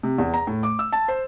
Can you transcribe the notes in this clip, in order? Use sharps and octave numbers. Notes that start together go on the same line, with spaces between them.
C3
E2
A#5
A2
D6
E6
A5
C5